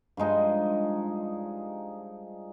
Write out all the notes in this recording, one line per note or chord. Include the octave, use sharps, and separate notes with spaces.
G2 F3 G#3 D#4